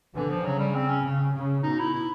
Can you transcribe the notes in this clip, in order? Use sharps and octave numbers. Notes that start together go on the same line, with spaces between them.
D3 E3
F3
C#3 F#3
G3
C4
C#4
C#3
C#3
B2 D#4
E4
E4